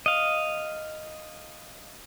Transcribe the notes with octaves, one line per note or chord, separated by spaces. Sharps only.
D#5 F5